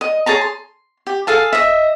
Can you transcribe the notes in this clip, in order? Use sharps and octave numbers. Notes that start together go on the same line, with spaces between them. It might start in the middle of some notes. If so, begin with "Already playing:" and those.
D#5
G#4 C#5 A5 A#5
C6
G4
G#4 A4 F5 A5
D#5 E5